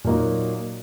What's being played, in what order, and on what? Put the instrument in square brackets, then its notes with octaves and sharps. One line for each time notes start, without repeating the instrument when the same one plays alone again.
[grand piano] A#2 F#3 A#3 D#4 F#4